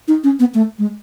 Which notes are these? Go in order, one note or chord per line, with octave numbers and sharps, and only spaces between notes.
D#4
C#4
B3
A3
G#3